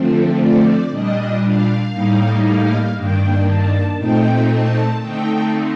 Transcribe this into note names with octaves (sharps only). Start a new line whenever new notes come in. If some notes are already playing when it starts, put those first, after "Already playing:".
Already playing: D3 F3 A3 C4
D5
A#2 G3 D4 D#5
F5
A2 G3 A#3 D#4
F5
G2 D#3 A#3 D4 G5
A5
A#2 A3 C4 D#4 G5
A5
D3 A3 C4 D#4 G5